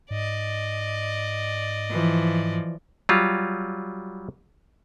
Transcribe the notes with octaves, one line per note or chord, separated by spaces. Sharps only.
G#2 D5 D#5
E3 F3
F#3 G3 F4